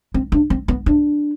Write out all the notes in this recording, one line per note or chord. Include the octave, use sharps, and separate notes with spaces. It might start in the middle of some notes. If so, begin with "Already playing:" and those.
C4
D4
C4
B3
D4